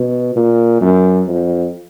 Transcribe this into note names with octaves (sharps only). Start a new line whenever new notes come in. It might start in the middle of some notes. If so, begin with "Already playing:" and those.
Already playing: B2
A#2
F#2
F2